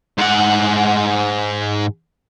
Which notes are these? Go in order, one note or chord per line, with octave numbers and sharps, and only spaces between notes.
G#2 F#5